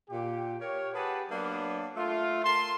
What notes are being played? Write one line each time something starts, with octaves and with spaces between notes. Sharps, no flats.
A#2 G4
G4 A#4 C#5
G4 G#4 B4 F#5 A5
F#3 A#3 B3 D4
A3 F4
A#4 A5 C6